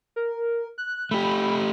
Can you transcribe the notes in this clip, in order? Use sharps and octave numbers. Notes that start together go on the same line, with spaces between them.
A#4
F#6
A3 G4 B5